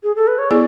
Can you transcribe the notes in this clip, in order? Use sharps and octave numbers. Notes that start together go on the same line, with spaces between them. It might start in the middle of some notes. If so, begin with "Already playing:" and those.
G#4
A4
B4
C#5
B3 E4 G#4 D5